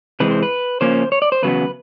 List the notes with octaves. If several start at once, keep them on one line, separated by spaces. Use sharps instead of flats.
C3 E3 G#3 C4 B4
C5
B4
C#3 F3 A#3 C#4 C5
C#5
D5
C5
E2 C#3 F#3 B3 B4